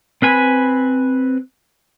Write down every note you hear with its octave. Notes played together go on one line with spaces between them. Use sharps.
C4 B4 G#5 B5